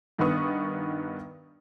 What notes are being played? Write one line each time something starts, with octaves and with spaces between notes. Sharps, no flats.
G2 D#3 B3 B4 C#6 D#6